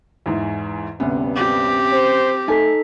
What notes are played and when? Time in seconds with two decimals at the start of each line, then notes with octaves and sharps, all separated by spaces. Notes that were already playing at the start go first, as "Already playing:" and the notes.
0.26 E2 G#2 E3
1.00 D2 G2 C3 B3 C#4
1.36 C4 G4
1.92 C5
2.48 A3 D#4 A4 G#5 B6